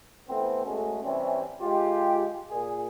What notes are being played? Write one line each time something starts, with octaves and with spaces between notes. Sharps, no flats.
E3 A3 B3 C4
G#3 A3 C#4 F#4 G#4 A4
C3 E3 G3 C4 C#4
G#3 F4 G4
A#2 G#4